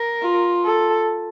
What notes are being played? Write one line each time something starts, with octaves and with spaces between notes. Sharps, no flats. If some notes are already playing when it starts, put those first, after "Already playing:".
Already playing: A#4
F4
A4